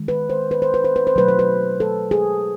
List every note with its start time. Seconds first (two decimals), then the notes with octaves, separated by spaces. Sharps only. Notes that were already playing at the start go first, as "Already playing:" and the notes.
Already playing: D#3 G#3
0.08 B4
0.30 C5
0.51 B4
0.62 C5
0.74 B4
0.84 C5
0.96 B4
1.07 C5
1.16 B2 F#3 A3 B4
1.28 C5
1.39 B4
1.80 A4
2.11 G#4